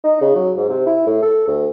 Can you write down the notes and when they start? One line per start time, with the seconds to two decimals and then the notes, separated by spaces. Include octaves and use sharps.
0.04 D#4
0.21 C#3
0.35 F#3
0.57 G#2
0.69 C3
0.87 E4
1.07 A2
1.22 A4
1.48 D2